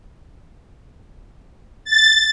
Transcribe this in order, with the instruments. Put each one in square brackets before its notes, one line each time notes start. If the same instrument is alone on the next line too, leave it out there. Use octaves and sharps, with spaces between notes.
[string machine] A6